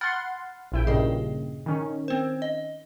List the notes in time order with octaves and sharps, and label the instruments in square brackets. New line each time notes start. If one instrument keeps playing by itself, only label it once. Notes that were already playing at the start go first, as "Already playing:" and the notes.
[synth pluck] F#5 C6 [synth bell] B5 F6 A6
[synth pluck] A#1 E4 G5
[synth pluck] G2 A#2 C#3 [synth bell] G#4 D#5
[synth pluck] D#3 C#4
[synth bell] C4 C5
D#5